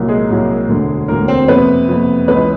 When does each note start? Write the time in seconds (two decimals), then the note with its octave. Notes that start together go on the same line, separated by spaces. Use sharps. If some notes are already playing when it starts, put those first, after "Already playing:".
Already playing: C2 A#2 F#3
0.08 G#3 G#4
0.28 C2 A#2 F#3 A#3
0.68 E1 D2 D3
1.08 E1 D2 D3 A#3 A#4
1.28 C4 C5
1.48 F#1 F2 C3 B3 B4
1.88 F#1 F2 C3
2.28 C#2 C#3 E3 G#3 B3 B4